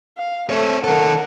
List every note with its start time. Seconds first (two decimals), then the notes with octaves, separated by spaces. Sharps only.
0.17 F5
0.50 A3 C4 C#5
0.84 D#3 A4 A#4 F#5